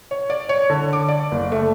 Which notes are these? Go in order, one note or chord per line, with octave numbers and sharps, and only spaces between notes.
C#5
D5
C#5
D3
D6
D5
F#1
A3